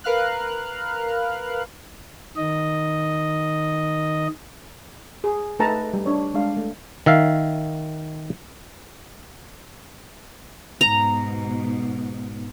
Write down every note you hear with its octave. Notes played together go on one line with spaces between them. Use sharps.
A#4 B4 F5 F6 F#6
D#3 D#5
G#4
A3 D#4 A4 B4 A5 A#5
G3
D4 C#5
G#3 D4 F5
A3
D#3 E5 F5
G#2 B2 A#5